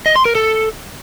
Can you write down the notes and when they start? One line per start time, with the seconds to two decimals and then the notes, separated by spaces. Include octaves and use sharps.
0.06 D#5
0.16 C6
0.25 A#4
0.35 A4